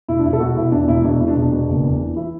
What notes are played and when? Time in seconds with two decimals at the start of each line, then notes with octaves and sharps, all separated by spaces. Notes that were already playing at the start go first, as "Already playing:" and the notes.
0.08 E1 E4
0.19 D4
0.25 E1 E4
0.33 A4
0.40 B2 F#4
0.57 B2 E4
0.72 E2 D4
0.88 E1 E4
1.05 B2 D4
1.20 E1 E4
1.28 D4
1.36 E1
1.42 D4
1.52 B2
1.69 F#1
1.84 E2
2.00 E3
2.16 E3 E4